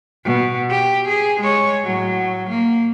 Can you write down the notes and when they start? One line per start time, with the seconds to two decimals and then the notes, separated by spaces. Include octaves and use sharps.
0.24 B2
0.70 G4
1.07 G#4
1.40 G#3 C#5
1.83 A2 F#3
2.49 A#3